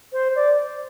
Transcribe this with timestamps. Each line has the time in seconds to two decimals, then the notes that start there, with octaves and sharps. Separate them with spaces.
0.13 C5
0.36 D5